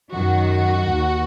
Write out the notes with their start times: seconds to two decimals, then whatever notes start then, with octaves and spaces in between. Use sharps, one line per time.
0.13 F#2 D#3 F#4
0.95 D#2